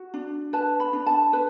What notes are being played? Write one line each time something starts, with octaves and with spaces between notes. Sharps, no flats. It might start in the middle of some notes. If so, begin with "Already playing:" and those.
Already playing: F#4
D4
B4 A5
B5
D4
A5
B4